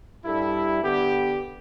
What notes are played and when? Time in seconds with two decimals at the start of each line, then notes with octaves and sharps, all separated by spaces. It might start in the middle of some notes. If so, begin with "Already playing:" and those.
0.23 G2 G3 E4 A4
0.82 D3 B3 G4